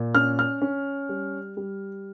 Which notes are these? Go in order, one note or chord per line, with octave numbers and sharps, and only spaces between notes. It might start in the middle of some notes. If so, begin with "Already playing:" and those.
Already playing: A#2
C#4 F6
F6
C#4
G3
G3